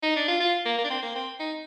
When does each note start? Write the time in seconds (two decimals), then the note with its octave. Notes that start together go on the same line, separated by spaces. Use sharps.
0.03 D#4
0.16 D4
0.28 F4
0.40 F4
0.65 A#3
0.78 A#3
0.84 D4
0.90 C4
1.02 A#3
1.15 C4
1.40 D#4